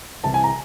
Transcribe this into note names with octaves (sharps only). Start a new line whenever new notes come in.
C2 C3 E3 A5
G#5
A#5